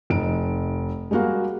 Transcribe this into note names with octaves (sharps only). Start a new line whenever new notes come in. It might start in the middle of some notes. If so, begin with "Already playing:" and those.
F1 D#4 D7
G3 G#3 A#3 F#4 F5